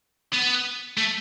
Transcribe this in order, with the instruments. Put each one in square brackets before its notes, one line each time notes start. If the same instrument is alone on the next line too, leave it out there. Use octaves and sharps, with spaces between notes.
[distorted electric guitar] B3
A3